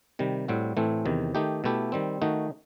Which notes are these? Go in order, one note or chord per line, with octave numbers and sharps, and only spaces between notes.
C3 D#3 G3
A2 G3 C4 F#4
A2 E3 A3 C4
E2 C3 D#3
D#3 A3 D#4 G4
B2 A3 E4 G4
D#3 G3 C4
D#3 A3 D#4 F#4